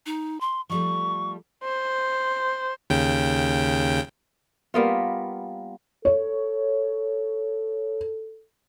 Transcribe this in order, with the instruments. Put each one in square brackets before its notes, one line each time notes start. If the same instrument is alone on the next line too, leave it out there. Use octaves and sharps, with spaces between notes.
[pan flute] D#4
C6
[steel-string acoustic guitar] F3 G3 A3 [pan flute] C#6
[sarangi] C5
[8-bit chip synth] D#2 C#3 G5
[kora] G3 A#3 B3 F4
[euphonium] A4 [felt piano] C#5